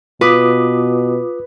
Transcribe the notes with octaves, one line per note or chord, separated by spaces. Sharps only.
B2 F4 B4 D6 D#6